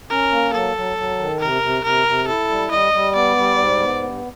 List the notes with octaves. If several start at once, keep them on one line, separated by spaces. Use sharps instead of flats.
C#4 A#4
A#3
F#3 A4
F#3
F#3
D#3
C3 A#4
C3
C3 A#4
C3
E4 A4
G3
G3 D#5
G3
B3 D5
G3
G#2
B3
G2